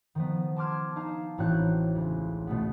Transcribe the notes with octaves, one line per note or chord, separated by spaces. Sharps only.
D#3 F3 B3
A5 C6 D6 F6 G#6
D#4 F5 A5
A1 A2 C4 F#4 C#5 F#6
C#2
B2 A3 B3